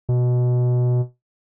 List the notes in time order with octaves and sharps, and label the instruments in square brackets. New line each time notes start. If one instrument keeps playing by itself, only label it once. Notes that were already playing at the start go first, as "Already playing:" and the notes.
[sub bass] B2